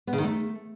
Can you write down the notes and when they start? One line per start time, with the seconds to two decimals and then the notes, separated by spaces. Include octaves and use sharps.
0.07 B3
0.13 C#3
0.18 D#3
0.24 A3